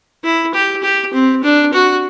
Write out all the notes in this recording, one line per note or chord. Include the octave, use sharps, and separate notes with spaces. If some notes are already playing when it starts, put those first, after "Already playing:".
E4
G4
G4
C4
D4
F#4